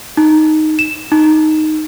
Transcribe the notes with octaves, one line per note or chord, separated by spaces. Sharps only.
D#4
E7
D#4